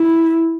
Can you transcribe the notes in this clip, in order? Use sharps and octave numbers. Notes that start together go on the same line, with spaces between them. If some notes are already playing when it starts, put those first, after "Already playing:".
Already playing: E4